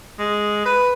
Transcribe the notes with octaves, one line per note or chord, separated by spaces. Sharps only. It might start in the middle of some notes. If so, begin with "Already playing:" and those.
G#3
B4